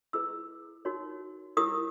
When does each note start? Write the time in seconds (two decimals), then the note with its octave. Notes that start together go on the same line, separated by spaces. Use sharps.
0.13 E4 G#4 B4 E6
0.85 D#4 F#4 A#4 C#5
1.57 E4 G4 A#4 C#5 D#6